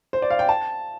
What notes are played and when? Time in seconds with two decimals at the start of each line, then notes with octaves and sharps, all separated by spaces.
0.13 C5
0.22 D5
0.30 F5
0.39 G5
0.49 A5